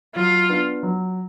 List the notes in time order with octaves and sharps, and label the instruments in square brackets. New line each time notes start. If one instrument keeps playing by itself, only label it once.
[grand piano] F#3 [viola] F4
[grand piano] B3 D4
F#3